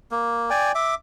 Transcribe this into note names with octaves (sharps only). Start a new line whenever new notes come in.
A#3
D5 G5 G#5
E5 D6